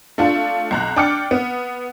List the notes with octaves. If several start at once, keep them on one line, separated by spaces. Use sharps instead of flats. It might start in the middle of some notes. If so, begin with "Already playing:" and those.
A3 D4 F4
B1 A#5 F#6
D4 G5 D6 F6 C#7
B3